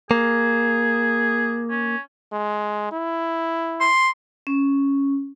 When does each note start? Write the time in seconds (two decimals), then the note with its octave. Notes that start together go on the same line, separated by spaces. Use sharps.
0.11 A#3 G#4
1.70 C#4
2.32 G#3
2.92 E4
3.80 C6
4.47 C#4